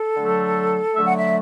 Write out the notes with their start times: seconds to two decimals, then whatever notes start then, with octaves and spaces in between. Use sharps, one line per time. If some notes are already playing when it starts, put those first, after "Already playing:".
Already playing: A4
0.16 D3 F#3 A3
0.95 D3 F#3 A3 E5
1.06 F#5
1.17 E5